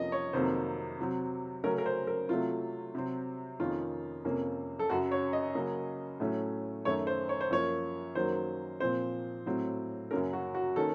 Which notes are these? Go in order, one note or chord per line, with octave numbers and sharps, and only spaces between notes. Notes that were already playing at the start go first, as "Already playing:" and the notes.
Already playing: F2 C3 F3 A#3 C#4 D#5
C#5
F2 C3 D#3 F#3 A#3 C5
C3 F#3 C4
C#3 F#3 A3 C#4 A#4
A#4
C5
A#4
C3 F#3 A3 F4
C3 F#3 C4
F2 D#3 A#3 C#4 F4
F2 C3 F3 A#3 C#4
A4
F#2 C#3 F#3 F#4
C#5
D#5
C#3 F#3 A#3 C#4
A2 F#3 A3 C#4
F#2 D#3 A3 C#5
C5
C#5
C5
F#2 F3 A#3 C#5
F#2 D#3 F#3 A#3 C5
A#2 F3 C4 C5
A2 F#3 C4
F#2 C#3 F#3 A#3 C#4 A#4
F#4
F#4
D#3 A#3 C#4 A4